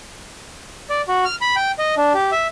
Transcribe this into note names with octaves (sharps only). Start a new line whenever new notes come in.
D5
F#4
F6
B5
G5
D#5
D4
G4
E5